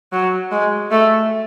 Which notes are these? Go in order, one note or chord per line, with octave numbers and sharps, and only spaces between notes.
F#3
G#3
A3